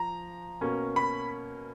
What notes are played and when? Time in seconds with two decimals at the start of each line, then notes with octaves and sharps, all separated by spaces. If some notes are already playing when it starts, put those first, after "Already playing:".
Already playing: F3 A#5
0.61 B2 A#3 C#4
0.96 B5